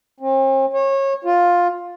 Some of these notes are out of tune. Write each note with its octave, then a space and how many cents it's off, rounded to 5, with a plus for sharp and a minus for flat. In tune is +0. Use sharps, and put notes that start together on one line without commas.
C4 +45
C#5 -25
F4 +10